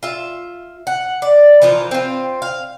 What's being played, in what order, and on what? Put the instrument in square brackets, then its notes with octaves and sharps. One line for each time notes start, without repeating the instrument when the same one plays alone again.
[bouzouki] F4 E5
F#5
D5
E3 F3 F4 A#4
C4 F4
F5